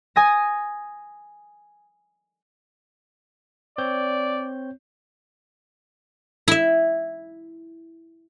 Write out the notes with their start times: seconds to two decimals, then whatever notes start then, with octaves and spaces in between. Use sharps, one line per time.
0.16 G#5 D#6 A#6
3.78 C4 C#5 D5 G6
6.48 E4 E5